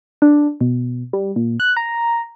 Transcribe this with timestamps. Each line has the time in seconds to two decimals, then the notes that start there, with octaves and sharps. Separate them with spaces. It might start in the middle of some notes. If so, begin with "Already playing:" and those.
0.22 D4
0.61 B2
1.13 G3
1.36 A#2
1.60 F#6
1.77 A#5